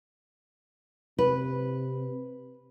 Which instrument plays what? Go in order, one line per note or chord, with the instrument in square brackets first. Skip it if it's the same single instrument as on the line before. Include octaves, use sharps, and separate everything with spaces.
[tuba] C3 [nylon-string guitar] B4